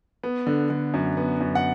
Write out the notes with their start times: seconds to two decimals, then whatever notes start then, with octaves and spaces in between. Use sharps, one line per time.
0.23 B3
0.47 D3
0.70 D3
0.94 F#2
1.17 B3
1.40 F#2
1.55 F#5